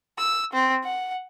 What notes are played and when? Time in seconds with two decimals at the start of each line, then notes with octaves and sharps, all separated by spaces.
0.18 E6
0.53 C4
0.84 F#5